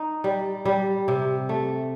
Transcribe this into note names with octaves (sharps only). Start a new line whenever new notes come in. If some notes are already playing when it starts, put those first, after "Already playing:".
Already playing: D#4
G3
G3
C3
A3